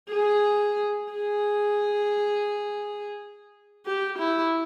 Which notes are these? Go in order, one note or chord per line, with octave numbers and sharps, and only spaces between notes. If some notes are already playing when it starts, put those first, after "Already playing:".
G#4
G#4
G4
E4